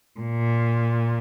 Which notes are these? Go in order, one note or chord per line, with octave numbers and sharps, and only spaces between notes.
A#2